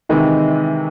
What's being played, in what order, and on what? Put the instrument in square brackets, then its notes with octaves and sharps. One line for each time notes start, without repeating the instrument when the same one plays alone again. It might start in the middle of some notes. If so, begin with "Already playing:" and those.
[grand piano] C3 E3 G#3 [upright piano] D#3